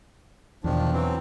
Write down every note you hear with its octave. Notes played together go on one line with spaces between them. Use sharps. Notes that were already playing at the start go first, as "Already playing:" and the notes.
E2 B2 D#3 F3 D4
E3 F#3 C4